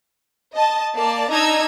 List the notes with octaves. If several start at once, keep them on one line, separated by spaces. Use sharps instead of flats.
D#5 A5
A#3 D5 A5
D4 D#4 D#5 A#5 E6 G#6